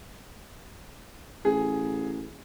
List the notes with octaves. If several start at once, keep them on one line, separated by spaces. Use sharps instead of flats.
A1 G#4